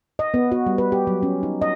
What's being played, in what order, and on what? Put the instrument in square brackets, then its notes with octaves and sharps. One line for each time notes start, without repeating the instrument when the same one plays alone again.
[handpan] D#5
B3
F#4
G3
B4
G4
F#3
C#4
D#4
D#5